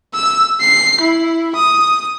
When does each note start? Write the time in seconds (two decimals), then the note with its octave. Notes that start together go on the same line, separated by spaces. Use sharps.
0.14 E6
0.61 C7
1.02 E4
1.56 D#6